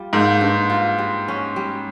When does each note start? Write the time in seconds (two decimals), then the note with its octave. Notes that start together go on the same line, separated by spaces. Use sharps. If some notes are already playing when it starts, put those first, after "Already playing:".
Already playing: G3 F4
0.13 G#2 A#3
0.41 G2
0.70 F4
0.98 G3
1.28 C#4
1.56 G3